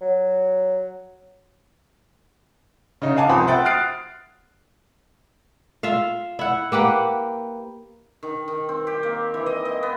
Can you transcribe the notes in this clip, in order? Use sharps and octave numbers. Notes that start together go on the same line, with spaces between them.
F#3
C#3 D#4
F5 F#5 G#5 A5 D6
C2 F3 C5 B5 D#6
C5 E5 F#5 G5 A6
D#6 F6 F#6 A6 C7 D7
F4 E5 F5
E4 F#5
A#3 G4 B4 F#5
D#3
D#3
C4
G4
A#3
E3
D#5
D#5
B3